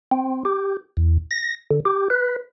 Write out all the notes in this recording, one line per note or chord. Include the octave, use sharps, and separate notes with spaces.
C4
G4
E2
A#6
D3
G4
B4